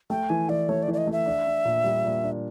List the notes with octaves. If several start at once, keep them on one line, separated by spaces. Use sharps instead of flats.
A3 G5
E3 G#5
E3 D5
A3 C#5
D5
E3
D5
D#5
A3
E5
D4
D4
A#2
G3
A#2
D4